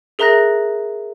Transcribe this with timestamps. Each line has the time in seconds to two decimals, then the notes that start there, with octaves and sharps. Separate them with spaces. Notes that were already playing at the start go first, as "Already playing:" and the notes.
0.19 G#4 A#4 E5 A#5 F#6 A#6